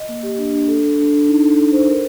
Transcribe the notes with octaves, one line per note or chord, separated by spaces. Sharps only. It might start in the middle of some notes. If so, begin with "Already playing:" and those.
Already playing: D#5
A#3
G4
D4
D4
A4
A4
D4
D4
D#4
A4
A4
C5
A#4